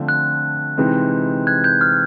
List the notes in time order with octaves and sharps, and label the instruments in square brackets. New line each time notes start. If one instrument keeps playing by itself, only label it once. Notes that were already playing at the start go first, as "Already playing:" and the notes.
Already playing: [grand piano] D3 F3 A3 C4 F4
[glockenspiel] F#6
[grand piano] C3 E3 G#3 C4 D#4
[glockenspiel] F#6 G#6
G6
F6